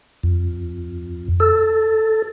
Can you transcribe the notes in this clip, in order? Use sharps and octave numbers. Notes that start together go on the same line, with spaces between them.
F2
A4